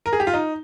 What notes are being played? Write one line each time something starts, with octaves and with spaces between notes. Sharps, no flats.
A#4
G#4
G4
F4
D#4